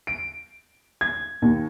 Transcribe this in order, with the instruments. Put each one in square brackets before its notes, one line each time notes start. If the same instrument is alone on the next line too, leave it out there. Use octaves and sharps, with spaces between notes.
[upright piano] D7
G#6
D#2